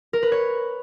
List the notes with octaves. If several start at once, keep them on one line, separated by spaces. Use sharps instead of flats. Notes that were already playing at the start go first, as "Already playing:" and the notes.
A#4
B4
C#5